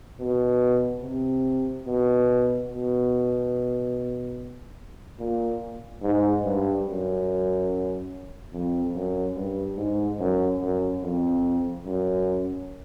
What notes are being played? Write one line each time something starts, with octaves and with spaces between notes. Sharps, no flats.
B2
C3
B2
B2
A#2
G#2
G2
F#2
F2
F#2
G2
G#2
F#2
F#2
F2
F#2